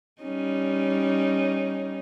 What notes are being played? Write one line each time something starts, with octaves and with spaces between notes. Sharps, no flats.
G3 C#4 D#4